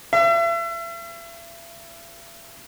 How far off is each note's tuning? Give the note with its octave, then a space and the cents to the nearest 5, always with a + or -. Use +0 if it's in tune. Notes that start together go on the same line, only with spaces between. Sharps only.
E5 +40